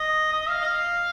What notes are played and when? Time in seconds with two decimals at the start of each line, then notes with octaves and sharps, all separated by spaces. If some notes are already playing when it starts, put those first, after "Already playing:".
Already playing: D#5
0.32 D#5
0.49 F5
0.61 D#5
0.65 F5